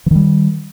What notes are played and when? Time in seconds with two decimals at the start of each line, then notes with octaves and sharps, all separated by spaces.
0.06 E3
0.11 D#3
0.15 G3